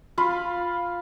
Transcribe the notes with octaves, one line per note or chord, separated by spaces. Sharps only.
F4 F5 B5